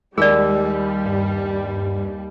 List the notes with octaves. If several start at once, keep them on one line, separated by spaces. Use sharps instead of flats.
D#2 G3 G#3 G#4 D5 E6
G2